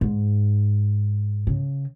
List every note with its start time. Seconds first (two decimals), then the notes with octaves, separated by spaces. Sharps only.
0.01 G#2
1.47 C#3